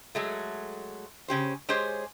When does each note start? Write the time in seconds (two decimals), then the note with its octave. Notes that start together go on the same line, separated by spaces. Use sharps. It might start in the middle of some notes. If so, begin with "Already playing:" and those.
0.15 F#3 G#3 A3
1.28 C#3 C#4 G4 C5
1.69 G#3 G4 G#4 C5 C#5